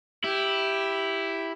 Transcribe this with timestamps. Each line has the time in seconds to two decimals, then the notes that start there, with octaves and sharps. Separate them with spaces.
0.24 E4 G4